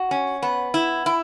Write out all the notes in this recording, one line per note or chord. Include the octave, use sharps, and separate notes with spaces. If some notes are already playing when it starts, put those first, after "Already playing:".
Already playing: F#4
C#4
B3
E4
E4